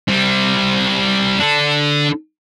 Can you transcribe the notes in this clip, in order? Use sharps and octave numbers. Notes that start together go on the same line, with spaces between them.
G3 C4
D4 A4